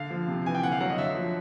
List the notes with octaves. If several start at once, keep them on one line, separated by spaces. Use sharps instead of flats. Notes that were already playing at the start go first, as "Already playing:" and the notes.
Already playing: D3 F5
F3
C3
E3 G#5
G5
D3 F#5
F5
F#3 F#5
D#5
D3 E5
F3